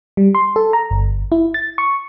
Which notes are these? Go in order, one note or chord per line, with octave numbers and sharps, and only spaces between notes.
G3
C6
A4
A#5
G1
E4
A6
C#6